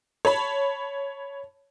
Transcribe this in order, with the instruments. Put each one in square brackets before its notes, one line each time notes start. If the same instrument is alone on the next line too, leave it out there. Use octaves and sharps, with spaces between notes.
[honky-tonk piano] C#5 A5 B5